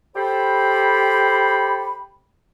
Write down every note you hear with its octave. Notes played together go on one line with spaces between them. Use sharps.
G4 A4 C5 B5